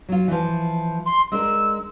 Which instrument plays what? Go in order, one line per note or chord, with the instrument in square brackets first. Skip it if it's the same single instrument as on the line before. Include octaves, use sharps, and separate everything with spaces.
[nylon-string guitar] F#3 F4
E3 F3
[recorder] C6
[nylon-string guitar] G#3 D4 A#4 [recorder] E6